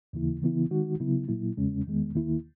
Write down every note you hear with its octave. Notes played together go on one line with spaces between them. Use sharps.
D#2 C#3 E3 A#3 E4
C#3 E3 B3 E4
D#3 G#3 D#4 F#4
C#3 F#3 B3 E4
A#2 F#3 A#3 E4
E2 C#3 G#3 C#4
E2 D#3 G#3 B3
D#2 D#3 A#3 E4